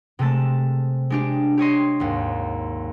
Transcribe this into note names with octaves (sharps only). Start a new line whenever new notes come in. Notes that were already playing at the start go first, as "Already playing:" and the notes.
C3 G#3 A3 A5
G#3 D4 G4
G4 C#5 D#5 C6
G#1 D#2